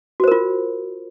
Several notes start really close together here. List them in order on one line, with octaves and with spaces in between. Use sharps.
F#4 C5 A#4 F4